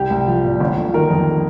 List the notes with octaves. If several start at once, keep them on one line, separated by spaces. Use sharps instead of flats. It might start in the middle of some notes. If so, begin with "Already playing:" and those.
Already playing: C2 G4
C2
F3
A#2
G1
G1
D#3 A#4
F2